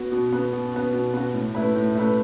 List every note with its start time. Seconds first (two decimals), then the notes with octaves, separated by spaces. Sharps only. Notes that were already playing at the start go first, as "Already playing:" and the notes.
Already playing: B3 F#4
0.12 B2
0.33 B3 F#4
0.53 B2
0.73 B3 F#4
0.93 B2
1.14 B3 F#4
1.34 A2
1.55 A3 E4 B4
1.75 A2
1.95 A3 E4 B4